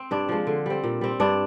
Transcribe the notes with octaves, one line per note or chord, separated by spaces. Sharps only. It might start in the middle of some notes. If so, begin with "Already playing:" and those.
Already playing: C4
G2 D4
F3 G#3
D3
G3 C4
A#2
G3 C4
G2 D4